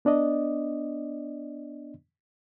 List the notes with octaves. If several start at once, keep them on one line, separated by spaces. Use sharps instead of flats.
B3 D4 D5 D#5